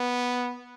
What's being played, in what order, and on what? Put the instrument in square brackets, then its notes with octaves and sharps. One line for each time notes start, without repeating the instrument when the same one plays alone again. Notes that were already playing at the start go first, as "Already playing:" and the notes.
Already playing: [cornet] B3